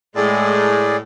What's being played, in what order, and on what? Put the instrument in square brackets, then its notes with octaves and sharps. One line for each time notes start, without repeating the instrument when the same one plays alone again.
[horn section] A2 [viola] G#3 [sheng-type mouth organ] G#4 D5